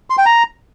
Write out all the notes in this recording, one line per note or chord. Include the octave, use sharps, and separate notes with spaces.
C6
G5
A#5